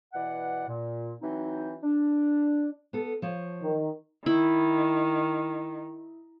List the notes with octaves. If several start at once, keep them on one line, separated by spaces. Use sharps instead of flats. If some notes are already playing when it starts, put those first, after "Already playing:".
B2 E3 D5 F#5
A#2
E3 F#3 C4 D#4
D4
B3 A4
F3 C#5
D#3
D#3 E4